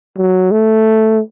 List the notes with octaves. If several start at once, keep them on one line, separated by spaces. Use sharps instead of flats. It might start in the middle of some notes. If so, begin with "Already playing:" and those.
F#3
A3